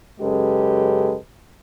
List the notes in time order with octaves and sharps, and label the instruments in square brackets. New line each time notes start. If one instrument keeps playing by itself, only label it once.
[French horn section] F#2 C#3 G#3 G4 A4 B4